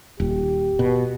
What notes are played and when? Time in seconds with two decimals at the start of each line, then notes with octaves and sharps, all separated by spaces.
0.20 D#1 G4
0.79 B2